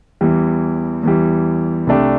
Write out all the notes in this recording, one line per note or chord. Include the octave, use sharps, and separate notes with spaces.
E2 E3 G3
E2 E3 G3
C2 C3 A3 D4 G4